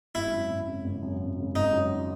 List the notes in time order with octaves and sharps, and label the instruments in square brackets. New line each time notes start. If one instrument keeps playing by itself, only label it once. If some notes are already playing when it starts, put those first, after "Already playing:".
[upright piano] G#1 [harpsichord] E4
[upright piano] F#2
G#1
C#3
G#1
F#2
G#1
C#3
[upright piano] G#1 [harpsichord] D#4
[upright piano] F#2